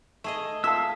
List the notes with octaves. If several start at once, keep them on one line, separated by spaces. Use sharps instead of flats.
A3 G#4 D#5
F4 E5 F5 A5 E6